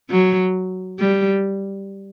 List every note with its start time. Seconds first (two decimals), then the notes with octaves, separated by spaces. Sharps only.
0.10 F#3
1.00 G3